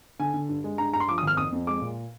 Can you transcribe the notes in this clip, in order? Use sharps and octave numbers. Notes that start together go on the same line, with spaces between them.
D3 G#5
D3
G2
G#3
G2 A#5
G2 A#5
C6
F3 D6
D#6
G#1 F6
F2 D#6
F2
G#3 D6
A#2